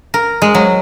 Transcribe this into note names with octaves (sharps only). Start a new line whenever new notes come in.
A#4
G#3
F#3